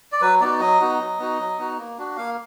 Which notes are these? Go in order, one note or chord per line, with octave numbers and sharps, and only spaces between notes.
D5
F#3 B4
B3 D#4 F#4 D5
F#3 D#5
B3 D#4 F#4
F#3
B3 D#4 F#4
F#3
B3 D#4 F#4
A#3
D4 F#4
A#3 F5